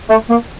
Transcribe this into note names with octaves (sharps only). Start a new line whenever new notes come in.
A3
A#3